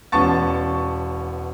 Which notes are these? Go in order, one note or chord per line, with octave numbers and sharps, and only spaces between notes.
E1 B3 C#4 A5 C#6 A6